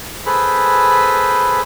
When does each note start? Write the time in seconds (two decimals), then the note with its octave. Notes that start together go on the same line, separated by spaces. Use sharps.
0.26 G#4 A4 B4 C5 B5